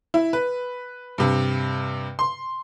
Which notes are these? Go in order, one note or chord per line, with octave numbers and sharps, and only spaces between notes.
E4
B4
G2 C3
C6